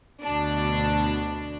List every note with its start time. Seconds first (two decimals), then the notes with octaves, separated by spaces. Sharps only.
0.23 D2 B2 D4